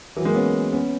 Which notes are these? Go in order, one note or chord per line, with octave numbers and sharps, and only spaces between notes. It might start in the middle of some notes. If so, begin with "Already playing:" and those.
E3 F#3
G#3 A#3
B3 C#4
B3 C#4